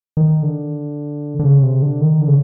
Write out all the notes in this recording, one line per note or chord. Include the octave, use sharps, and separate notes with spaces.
D#3
D3
D3
C#3
C3
D3
D#3
D3
C#3